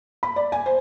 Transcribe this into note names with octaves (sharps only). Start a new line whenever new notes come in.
B5
D5
G#5
C5